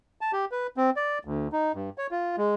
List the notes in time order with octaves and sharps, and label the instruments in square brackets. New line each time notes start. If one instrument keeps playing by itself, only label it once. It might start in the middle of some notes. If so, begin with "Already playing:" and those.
[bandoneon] A5
G4
B4
C4
D5
D2
D#4
G2
C#5
F4
G#3